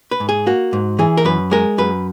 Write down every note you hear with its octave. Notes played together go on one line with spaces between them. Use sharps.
B4
G#2
G#4
A#3 F#4
G#2
E3 G#4
A#4
F#2 B4
G#3 A#4
F#2 B4